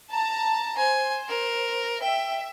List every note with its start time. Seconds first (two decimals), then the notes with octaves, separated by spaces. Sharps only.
0.12 A5 A#5
0.77 C5 G#5
1.29 A#4
2.02 E5 G5